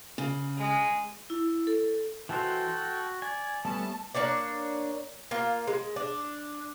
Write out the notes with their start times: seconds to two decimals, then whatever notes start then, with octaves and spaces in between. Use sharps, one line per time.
0.18 C#3
0.58 G#3 G#5
1.30 E4
1.67 A4
2.29 E3 F#4 A4 C5 G5
2.68 F#4
3.22 D5 G#5
3.65 G3 A3 B3 C#4 A5
4.14 A#3 D4 C#5 D5
5.31 A#3 F4
5.67 G#3
5.96 D4